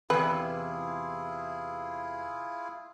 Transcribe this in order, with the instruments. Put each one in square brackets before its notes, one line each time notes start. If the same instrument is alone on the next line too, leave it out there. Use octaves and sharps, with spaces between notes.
[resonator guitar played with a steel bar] E2 C3 [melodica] E4 F4 G#4 [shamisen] B4